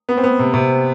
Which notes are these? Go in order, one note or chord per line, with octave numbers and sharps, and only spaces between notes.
B3
C4
B3
C3
C3